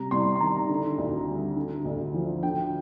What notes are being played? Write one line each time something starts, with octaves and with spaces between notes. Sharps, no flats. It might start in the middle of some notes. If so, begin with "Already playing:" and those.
Already playing: C3 G3 A#5
C2 C6
C6
D#3 A#5
D3
D2
G3
D3
D2
F3
D3 G5